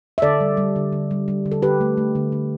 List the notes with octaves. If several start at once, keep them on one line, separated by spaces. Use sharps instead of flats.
E5
D3 A4 D5
G3
G3
D3
D3
G3
G3
D3
A4
D3 G4 B4
A3
A3
D3
D3